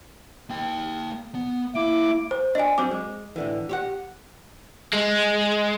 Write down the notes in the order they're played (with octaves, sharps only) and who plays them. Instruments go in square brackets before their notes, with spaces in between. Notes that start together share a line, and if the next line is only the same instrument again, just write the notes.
[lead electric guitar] A#3 G5
B3
[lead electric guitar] A#3 [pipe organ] E4 D6
[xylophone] C5
[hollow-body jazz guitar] D4 D5 [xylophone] D#5 G#5
[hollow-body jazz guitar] F#3 C4 C#4 [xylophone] D6
[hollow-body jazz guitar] G#3
A2 D3 E3
G4 C#5 F#5
[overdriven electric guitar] G#3